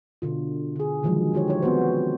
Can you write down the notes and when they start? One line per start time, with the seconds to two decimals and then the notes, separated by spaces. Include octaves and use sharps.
0.22 B2 D3 F4
0.76 D3 G#4
1.03 D3 D#3 F3 F#3 G#3
1.33 D3 F4 G4 C#5
1.48 D#4 C#5
1.62 B3 C4 F#4 C5